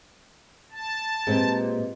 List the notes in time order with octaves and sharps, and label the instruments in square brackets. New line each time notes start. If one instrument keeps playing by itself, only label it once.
[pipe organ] A5
[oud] A#2 [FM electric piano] G#3 C4 [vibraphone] G4 B4 D#5